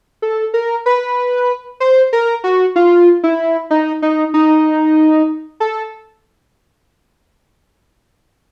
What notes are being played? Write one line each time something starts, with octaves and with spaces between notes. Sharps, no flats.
A4
A#4
B4
C5
A#4
F#4
F4
E4
D#4
D#4
D#4
A4